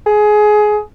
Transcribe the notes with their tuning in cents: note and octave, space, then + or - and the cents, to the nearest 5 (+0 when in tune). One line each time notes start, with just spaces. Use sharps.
G#4 +20